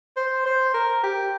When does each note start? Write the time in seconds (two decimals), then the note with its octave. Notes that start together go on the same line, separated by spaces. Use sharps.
0.16 C5
0.46 C5
0.74 A#4
1.03 G4